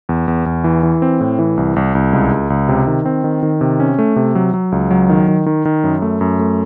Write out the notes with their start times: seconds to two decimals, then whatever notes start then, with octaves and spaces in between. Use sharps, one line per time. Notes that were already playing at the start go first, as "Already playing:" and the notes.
0.09 E2
0.28 E2
0.46 E2
0.64 E3
0.83 E3
1.02 C4
1.21 A2
1.39 E3
1.57 C2
1.76 C2
1.95 C2
2.13 C#2
2.31 C#2
2.50 C#2
2.69 C3
2.87 D#3
3.05 C4
3.24 D#3
3.43 D#3
3.61 C3
3.80 C#4
3.99 A3
4.16 C3
4.35 F#3
4.54 F#3
4.72 C#2
4.91 F#3
5.09 D#3
5.28 D#3
5.46 D#3
5.65 D#3
5.84 F#2
6.02 A3
6.21 F#2
6.39 A3